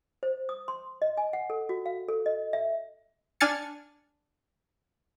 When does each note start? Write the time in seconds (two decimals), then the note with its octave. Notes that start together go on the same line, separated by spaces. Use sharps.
0.23 C5
0.49 D#6
0.68 C6
1.02 D#5
1.17 G#5
1.33 F#5
1.50 A4
1.69 F#4
1.86 F5
2.08 A4
2.26 D#5
2.53 E5
3.40 D4 G#5 F6 A6 C#7